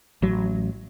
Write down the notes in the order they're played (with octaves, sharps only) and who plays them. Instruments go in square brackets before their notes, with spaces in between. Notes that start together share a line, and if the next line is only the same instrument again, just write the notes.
[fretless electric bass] A1 F#3